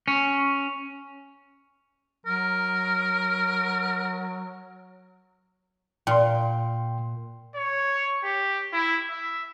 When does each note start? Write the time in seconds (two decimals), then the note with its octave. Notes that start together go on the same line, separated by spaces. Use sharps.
0.08 C#4
2.26 F#3 A#4
6.07 A#2 G5 C6
7.56 C#5
8.24 G4
8.73 E4
9.11 E5